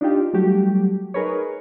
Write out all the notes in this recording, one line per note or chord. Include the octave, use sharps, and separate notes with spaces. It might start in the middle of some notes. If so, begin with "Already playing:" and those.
D4 D#4 F4 G4
F#3 G3 A3 F#4 G4
D#4 G#4 A#4 B4 C#5